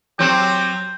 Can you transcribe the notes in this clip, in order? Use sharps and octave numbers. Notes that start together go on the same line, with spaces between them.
F#3 C4 G4 G6